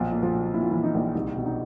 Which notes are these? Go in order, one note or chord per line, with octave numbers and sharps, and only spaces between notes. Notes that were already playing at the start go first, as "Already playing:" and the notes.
Already playing: B1 A#2 F3 F4
A#2
F3 F4
A#2
A#2 E4
F4
A#2 E3 E4
D#4
A#1
C2 D#4
B2
D#4